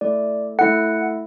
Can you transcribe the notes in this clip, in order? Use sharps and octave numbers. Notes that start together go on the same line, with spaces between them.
A3 E4 A4 D5
A3 E4 A4 F#5